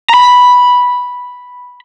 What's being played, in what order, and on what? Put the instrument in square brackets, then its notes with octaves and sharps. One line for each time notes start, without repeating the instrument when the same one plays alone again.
[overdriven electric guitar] A#5 B5